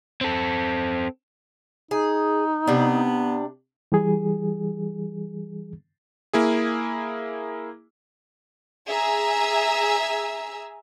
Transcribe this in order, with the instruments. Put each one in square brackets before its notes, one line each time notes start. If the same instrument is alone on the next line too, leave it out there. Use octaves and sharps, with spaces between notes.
[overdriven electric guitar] C4 A4
[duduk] D#4 [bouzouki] G#4
[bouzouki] C3 D4 [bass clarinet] B3
[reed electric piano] E3 G3 G#4
[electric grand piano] A#3 E4 G#4
[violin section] G#4 E5 G#5 A#5 E6